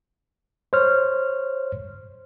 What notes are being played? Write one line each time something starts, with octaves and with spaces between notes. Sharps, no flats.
C5 C#5 F6